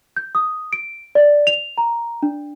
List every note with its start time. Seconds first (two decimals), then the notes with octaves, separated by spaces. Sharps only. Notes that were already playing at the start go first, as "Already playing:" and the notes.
0.16 G6
0.35 D#6
0.73 D7
1.15 D5
1.47 F7
1.78 A#5
2.23 D4